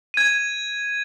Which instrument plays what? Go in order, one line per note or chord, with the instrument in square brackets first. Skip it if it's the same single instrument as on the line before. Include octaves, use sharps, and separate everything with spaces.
[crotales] G#6 D#7